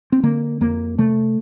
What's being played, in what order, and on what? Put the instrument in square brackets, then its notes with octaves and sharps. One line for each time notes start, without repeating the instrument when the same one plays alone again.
[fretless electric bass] C4
D3 A#3
F2 A#3
C3 A3